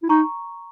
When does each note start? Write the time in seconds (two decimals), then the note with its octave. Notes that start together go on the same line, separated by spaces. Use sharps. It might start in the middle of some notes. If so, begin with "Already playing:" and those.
0.03 E4
0.09 D#4 A#5 C#6